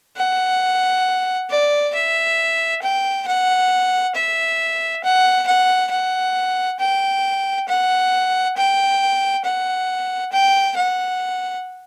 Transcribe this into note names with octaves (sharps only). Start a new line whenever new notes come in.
F#5
D5
E5
G5
F#5
E5
F#5
F#5
F#5
G5
F#5
G5
F#5
G5
F#5